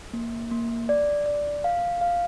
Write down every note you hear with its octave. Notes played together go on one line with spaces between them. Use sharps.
A#3
A#3
D5
D5
F5
F5